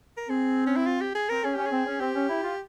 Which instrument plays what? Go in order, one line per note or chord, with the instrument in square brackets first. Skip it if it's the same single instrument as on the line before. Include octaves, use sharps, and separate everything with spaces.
[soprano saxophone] A#4
[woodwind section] C4 [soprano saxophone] G#4
[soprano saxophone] C#4
E4
F4
G4
G#4
[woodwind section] C4 [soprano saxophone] A#4
[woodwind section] C#4 [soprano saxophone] G#4
[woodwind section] C#4 [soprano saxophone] G4
[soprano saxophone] G#4
[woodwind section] C4
C#4
[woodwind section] C4 [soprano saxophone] G4
[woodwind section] C#4
E4
F4